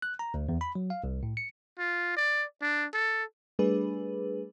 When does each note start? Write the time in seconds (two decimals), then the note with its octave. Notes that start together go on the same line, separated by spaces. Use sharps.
0.02 F#6
0.19 A#5
0.34 D2
0.49 E2
0.61 B5
0.75 F#3
0.90 F5
1.04 C2
1.23 A2
1.37 C#7
1.78 F4
2.16 D5
2.62 D4
2.94 A4
3.59 G3 A3 D4 G#4 B4